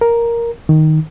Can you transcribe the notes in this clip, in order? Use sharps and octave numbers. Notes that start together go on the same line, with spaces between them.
A#4
D#3